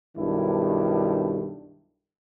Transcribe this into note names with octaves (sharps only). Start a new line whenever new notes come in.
B1 G2 D#3 D4 E4